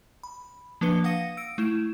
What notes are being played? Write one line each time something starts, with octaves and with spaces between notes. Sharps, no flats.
B5
F3 A#3 D4 B4 C#7 G7
F5 F#5 D#6 A#6 C#7 D#7
E6 D7
A3 E4 E7